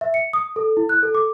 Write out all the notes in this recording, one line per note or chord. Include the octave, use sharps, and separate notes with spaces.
E5
C#7
D#6
A4
E4
F#6
A4
D6